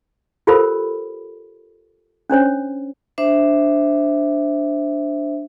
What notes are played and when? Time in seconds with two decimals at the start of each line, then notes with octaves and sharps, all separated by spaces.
0.47 F4 G4 A4 A#4 C5 B5
2.30 C#4 D4 C5 C#5
3.18 D4 C5 E5